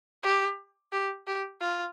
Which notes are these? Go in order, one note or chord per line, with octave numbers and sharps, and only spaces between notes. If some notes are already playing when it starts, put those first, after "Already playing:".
G4
G4
G4
F4